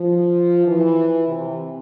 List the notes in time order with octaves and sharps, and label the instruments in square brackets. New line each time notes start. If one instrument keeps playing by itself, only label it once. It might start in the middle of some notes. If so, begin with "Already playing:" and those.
Already playing: [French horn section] F3
E3
C3